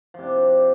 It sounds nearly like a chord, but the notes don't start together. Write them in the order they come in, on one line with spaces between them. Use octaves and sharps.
F3 C3 D4